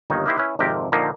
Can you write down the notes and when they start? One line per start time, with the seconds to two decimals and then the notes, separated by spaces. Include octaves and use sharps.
0.10 G1 D#2 D#3 D#4 C#5
0.26 A#3 D#4 E4 G4 C5
0.38 C#4 E4 B4
0.59 G#1 F2 C3 G4 A#4
0.92 A#2 D3 D#3 F3 A#3 D#4